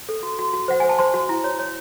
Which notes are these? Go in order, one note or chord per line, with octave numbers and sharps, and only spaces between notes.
A4
F#4
F#4
F#4
C5 F#5
C5 G#5
A5
C5 C6
F#4
E4
C#5
C#5